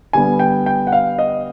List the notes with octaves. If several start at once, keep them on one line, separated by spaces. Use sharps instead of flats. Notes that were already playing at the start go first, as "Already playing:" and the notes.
D3 G3 B3 G#5
G5
G5
F#5
F5
D#5